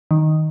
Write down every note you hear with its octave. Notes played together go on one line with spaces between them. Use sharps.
D#3